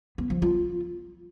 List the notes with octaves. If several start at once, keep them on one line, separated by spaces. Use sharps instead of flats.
B3
F3
F4